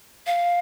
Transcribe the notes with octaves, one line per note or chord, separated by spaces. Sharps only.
F5